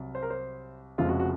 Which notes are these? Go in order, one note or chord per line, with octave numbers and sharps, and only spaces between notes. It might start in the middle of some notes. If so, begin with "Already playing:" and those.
Already playing: C2 C3 F#3
C5
A#4
C5
F1 F2 C#3 F3 G#3 F4
F#4
F#4